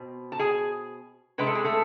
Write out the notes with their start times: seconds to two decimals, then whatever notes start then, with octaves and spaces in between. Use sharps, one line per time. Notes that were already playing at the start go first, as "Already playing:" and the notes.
Already playing: B2 C4
0.32 A5
0.39 G#4 G#5
1.38 C3 G#3 D4 B4
1.47 A4
1.55 G#4
1.64 A3 A4